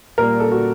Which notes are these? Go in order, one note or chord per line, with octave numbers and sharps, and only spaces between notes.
A#2 G3 A#4
A4
F#4